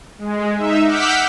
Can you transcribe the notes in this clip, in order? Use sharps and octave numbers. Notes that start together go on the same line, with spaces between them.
G#3
D#4 E5
F#5 D6 E6 F6 G6 B6